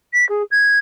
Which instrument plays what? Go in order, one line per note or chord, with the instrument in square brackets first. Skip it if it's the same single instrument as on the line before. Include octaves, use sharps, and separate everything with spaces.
[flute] B6
G#4
G#6